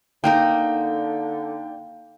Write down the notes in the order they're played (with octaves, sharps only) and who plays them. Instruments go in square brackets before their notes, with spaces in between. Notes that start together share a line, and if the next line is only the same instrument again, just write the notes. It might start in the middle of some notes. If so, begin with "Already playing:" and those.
[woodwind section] D3 [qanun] A#3 D#4 A#4 [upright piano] G5